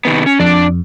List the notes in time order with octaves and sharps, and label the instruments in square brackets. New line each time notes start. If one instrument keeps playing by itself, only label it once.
[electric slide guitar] C3 D#3 B3
C#4
[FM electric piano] F2 [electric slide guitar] D4 D5